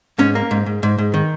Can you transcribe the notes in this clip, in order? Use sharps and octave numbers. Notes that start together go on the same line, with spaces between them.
G#2 C#4
A#3
G#2
G#2
G#2
G#2
D#3